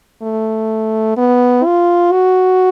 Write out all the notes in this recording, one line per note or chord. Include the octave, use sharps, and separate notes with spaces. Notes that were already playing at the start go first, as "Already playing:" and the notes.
A3
B3
F4
F#4